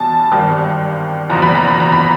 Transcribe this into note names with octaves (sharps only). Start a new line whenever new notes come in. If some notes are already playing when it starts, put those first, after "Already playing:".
Already playing: E2 B2 G3 G#5 A5
G#1 G2 D#3
F#1 E2 B2 A#5
B5
A#5
B5
A#5
B5